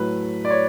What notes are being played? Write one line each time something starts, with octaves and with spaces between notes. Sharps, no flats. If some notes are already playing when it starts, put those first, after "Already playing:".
Already playing: A2 F#3 A3 B4
D5
C#5